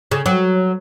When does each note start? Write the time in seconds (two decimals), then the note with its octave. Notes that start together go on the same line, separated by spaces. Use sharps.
0.11 C#3
0.26 F#3